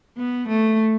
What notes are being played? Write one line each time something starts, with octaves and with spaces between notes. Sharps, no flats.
B3
A3